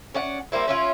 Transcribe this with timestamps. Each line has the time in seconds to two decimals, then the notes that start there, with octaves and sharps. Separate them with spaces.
0.14 C#4 D5 F#5
0.52 G3 A#3 C4 E4
0.68 C#4 E4 F4